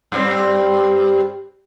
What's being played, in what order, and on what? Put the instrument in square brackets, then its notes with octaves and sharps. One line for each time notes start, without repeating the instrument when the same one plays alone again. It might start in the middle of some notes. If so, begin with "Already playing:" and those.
[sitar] G2 G3 C4